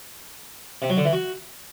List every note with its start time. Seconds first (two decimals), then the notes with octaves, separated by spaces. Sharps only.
0.82 C3
0.90 F#3
0.97 D3
1.05 E3
1.13 F#4